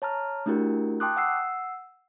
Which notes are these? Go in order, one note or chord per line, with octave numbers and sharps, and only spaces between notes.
C#5 A5 A#5 F6
A3 D4 E4 F#4 G4 A#4
G5 A5 C6 D6 D#6 F#6
F#5 E6 C7